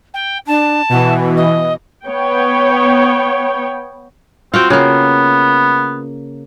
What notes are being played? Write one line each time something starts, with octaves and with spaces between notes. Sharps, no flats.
G5
D4 A5
B2 E3 F#4
D#5
B3 C#5 G5
C4 F4 F#4 G5
C#3 A#3 B3